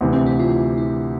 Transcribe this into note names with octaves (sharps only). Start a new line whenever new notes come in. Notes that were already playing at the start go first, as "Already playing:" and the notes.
D2 C3 E3
C4
E4
F4
E4